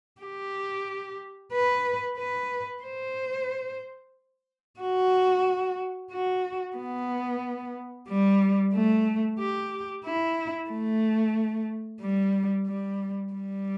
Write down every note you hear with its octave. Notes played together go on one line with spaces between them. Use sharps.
G4
B4
B4
C5
F#4
F#4
B3
G3
A3
G4
E4
A3
G3
G3
G3